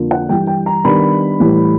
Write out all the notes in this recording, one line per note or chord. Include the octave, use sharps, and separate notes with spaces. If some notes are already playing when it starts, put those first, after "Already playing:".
Already playing: F2 D3 F3 A#3
F#5
G2 E3 G3 G5
G5
A#5
D#3 G3 B3 D4 B5
A2 E3 G3